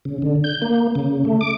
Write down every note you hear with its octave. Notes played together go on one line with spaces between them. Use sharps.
C#3
D3
G6
A#3
C#3
A3
D6